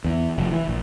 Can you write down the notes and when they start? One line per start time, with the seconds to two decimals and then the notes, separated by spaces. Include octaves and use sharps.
0.04 E2
0.38 F1
0.52 E3
0.68 A#1